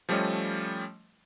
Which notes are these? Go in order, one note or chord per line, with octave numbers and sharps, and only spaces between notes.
F3 G3 A3 C#4 C#5 D#5